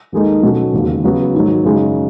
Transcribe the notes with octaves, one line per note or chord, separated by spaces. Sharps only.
D#2 D#3 G#3 D#4 A4
B2 F#3 C#4 F#4 A4
E1 D#2 C#3
C#3 F#3 B3
G#2 D#3 F#3
F#2 C#3 G#3 D#4